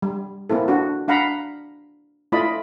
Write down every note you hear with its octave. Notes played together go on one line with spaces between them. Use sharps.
G3
A#3 C4 E4 A4
D4 F#4
D4 F5 F#5 A#5 B5
A3 E4 F4 D5 D#5 B5